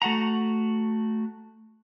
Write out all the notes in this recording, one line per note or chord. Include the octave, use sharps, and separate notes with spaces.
A3 F#4 F#5 A#5